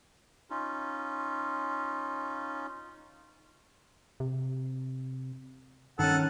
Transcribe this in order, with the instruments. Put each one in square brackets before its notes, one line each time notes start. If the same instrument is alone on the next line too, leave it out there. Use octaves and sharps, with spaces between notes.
[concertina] C#4 D#4 F4
[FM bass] C3
[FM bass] G2 [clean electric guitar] D#3 C#4 [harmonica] A4 F#5